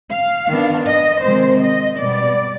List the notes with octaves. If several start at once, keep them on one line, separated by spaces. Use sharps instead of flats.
F5
D#3 B3 D4
D#5
C3 D#3 G#3 C4 C5
D#5
B2 G3 B3 D5